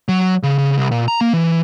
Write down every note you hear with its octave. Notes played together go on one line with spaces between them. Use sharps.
F#3
C#3
C#3
C2
A#2
A#5
A#3
E3